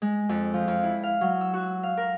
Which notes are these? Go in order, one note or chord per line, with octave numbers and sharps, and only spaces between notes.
G#3
F2
F3
F2
E4
F5
F#3
E6
F#4
F5
A#4